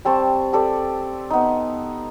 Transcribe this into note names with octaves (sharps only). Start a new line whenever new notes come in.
G3 C4 A5 C#6
G4 A4 D5
B3 D#4